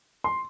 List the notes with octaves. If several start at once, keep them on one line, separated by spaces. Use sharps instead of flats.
C6